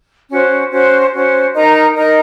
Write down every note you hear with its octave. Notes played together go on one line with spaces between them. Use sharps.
C#4 F#4 C5
C#4 F#4 C5
C#4 F#4 C5
D#4 A#4 D#5 A#5
D#4 A#4 D#5 A#5